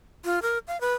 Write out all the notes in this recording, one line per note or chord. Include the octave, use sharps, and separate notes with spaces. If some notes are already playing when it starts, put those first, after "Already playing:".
F4
A#4
F5
B4